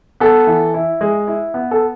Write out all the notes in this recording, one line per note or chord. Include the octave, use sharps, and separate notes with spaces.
B3 A4
E3
E4
G#3
E4
B3
A4